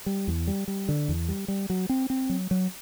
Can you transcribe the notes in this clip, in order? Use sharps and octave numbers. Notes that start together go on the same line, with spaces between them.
G3
E2
G3
G3
D3
E2
G3
G3
F#3
C4
C4
F#3
F#3